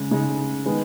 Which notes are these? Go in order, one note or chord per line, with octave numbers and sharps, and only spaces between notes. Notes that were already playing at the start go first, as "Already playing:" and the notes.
Already playing: C#3 G#3
C#3 G#3 D#4
D#3 G#3 B3